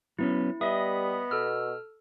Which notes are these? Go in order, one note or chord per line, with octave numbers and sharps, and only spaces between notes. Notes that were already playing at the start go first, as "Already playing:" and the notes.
F#3 B3 C#4 E4
G3 B3 D#5 E5 D#6
B2 A4 E6 F6